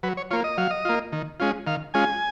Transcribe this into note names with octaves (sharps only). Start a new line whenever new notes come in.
F#3 B4
C#5
A#3 F4 C#5
D#5
F#3 F5
D#5
A#3 F4
D#3
G#3 C#4 F4
D#3 F5
G#3 C#4 F4 G#5